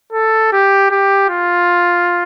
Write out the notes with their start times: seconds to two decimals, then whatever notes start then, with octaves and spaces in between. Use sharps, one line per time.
0.13 A4
0.52 G4
0.91 G4
1.29 F4